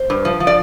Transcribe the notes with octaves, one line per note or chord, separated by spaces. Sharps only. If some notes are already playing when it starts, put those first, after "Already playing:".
Already playing: C5
G2
F3
F3
D5